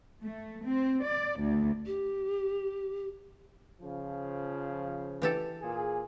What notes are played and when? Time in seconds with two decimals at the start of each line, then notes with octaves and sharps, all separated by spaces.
0.24 A3
0.65 C4
1.04 D5
1.42 D2
1.86 G4
3.81 C#3 F3
5.22 E3 G4 A4
5.62 A#2 G#4